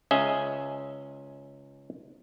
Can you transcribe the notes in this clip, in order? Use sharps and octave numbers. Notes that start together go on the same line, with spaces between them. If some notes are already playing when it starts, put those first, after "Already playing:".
C#2 C#4 G#4 D#5 E5